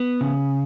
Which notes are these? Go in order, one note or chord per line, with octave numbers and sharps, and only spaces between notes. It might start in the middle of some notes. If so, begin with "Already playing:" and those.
Already playing: B3
C#3